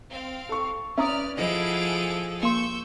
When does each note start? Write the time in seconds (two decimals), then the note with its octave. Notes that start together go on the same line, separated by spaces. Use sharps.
0.11 C4 F5
0.49 A4 C#6
0.98 C#4 B4 D5 E5 A#5 D#6 F6
1.37 F3 E4 G#4 A4 D#5 F#5 D7
2.43 A#3 C6 C#6 E6 G6